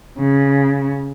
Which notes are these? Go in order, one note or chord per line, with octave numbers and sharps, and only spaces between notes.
C#3